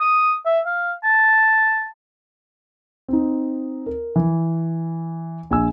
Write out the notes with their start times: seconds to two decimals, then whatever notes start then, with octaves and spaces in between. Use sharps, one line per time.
0.01 D#6
0.46 E5
0.66 F5
1.04 A5
3.08 C4 D#4
3.86 A#4
4.16 E3
5.50 A#1 G#5 E6